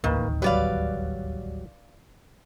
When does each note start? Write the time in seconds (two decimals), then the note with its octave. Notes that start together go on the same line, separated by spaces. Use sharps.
0.04 D1 A1 D#2 D#3 A#3 B4
0.42 F#3 G3 B4 D5 F5